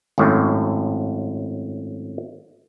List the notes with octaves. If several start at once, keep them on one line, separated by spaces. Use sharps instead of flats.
G#1 F#2 A2